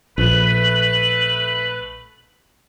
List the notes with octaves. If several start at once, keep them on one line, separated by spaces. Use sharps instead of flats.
A#1 A3 B4 F#7